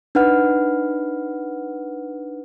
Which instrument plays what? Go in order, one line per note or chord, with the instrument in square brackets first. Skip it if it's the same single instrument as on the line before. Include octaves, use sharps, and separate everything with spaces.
[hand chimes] D4 D#4 B4 F#5 F6